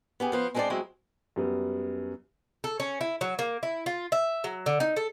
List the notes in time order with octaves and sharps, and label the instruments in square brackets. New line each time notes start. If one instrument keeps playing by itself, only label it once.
[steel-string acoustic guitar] B3 G4 G#4
F3 B3 C5
G#3 C4 D4 G4 C5 D5
F#3 G#3 C4 E4
[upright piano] F#2 G3 B3
[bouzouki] A4
C#4
E4
F#3
A#3
E4
F4
E5
F#3
D3
D#4
A4